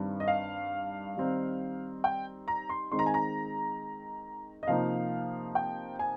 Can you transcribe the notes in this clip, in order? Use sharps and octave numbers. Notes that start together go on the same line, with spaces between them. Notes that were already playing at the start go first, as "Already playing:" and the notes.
Already playing: G2 D#3 G3 C4
D#5
F5
D#3 G3 C4 D#4
G5
A#5
C6
D#3 G#3 C4 D#4 C6
A#5
G#5
A#5
D#5
C3 F3 A#3 D#4 F5
G5
G#5